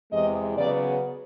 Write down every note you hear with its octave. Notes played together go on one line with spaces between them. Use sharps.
E2 C3 E3 G#3 D#5
C#3 F#3 B3 D5